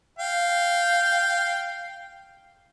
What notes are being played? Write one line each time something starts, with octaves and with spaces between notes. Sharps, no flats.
F5 G5